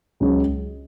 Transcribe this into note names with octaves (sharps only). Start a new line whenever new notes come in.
C#2 C#3 F#3 C#4 G#4